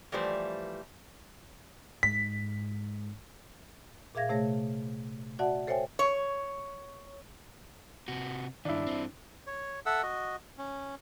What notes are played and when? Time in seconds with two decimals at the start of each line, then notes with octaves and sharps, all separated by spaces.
0.12 E3 F3 G3 A3 B4 C5
2.03 G#2 B6
4.15 A#2 G#4 E5 F5 G#6 A#6
4.29 C3 A3 G#4 C#5 A#6
5.39 F#4 D5 E5 F#5 A5
5.67 A4 C5 C#5 E5 G5 G#5
5.99 C#5
8.08 C3 F#4
8.65 G2 D#3 D4 E4
8.87 G2 C4
9.47 C#5
9.86 A4 E5 F#5 E6
10.03 F#4 D#5
10.58 C#4